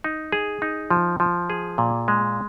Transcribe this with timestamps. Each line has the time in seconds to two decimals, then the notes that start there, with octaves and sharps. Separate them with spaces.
0.04 D#4
0.32 G#4
0.62 D#4
0.90 F3
1.20 F3
1.50 G#4
1.78 A#2
2.08 G#3